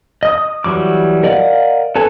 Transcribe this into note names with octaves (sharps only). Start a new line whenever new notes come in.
D#5 D#6
D#6
E3 F#3 G3 D6
A#4 D5 D#5 F5 F#5
A4 B4 C#5 G#5